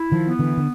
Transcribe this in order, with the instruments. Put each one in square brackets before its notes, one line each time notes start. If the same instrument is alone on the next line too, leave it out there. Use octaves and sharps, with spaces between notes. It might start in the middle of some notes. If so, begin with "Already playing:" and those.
Already playing: [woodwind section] E4
[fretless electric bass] D#3 F3
[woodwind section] B3
[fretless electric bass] D3 E3
D3